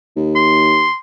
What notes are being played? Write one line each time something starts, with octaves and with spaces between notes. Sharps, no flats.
D#2
C6